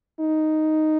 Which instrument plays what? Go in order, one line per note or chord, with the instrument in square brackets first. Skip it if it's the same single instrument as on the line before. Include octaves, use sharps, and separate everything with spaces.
[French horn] D#4